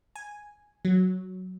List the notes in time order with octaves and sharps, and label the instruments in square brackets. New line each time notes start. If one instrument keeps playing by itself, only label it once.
[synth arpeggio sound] G#5
F#3